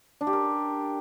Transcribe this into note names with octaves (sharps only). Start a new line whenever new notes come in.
D4
G4
A#4